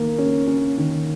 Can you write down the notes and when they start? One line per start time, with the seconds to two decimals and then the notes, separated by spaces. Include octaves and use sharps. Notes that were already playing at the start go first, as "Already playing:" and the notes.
Already playing: D#3 A#3
0.18 C#4
0.47 C#4
0.78 D#3